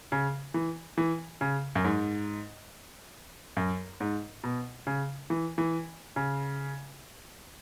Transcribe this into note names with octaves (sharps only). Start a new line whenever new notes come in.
C#3
E3
E3
C#3
F#2
G#2
F#2
G#2
B2
C#3
E3
E3
C#3